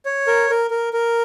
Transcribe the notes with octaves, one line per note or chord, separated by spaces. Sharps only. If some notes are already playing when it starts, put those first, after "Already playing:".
C#5
A#4
A#4
A#4
A#4